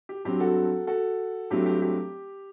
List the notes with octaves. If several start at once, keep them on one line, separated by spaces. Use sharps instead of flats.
G4
G2 F#3 C4 G4
F#4 A4
F#4 A4
G2 F#3 A3 C4 G4
G4
G4